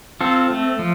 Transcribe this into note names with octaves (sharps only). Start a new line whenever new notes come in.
C4 F4 A4
A3
F3